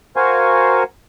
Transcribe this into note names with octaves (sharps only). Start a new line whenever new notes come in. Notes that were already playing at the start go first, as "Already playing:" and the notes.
F#4 A#4 C5 F5 G#5 C#6